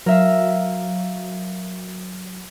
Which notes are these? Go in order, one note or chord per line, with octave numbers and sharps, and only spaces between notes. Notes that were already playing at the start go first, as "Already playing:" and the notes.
F#3 A#4 E5 F5